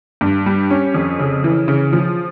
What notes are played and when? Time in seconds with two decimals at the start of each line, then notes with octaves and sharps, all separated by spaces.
0.21 G2
0.46 G3
0.71 C#4
0.94 F2
1.19 C#3
1.44 E3
1.68 C#3
1.93 F3